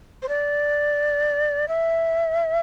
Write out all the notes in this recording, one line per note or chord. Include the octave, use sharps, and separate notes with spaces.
C5
D5
E5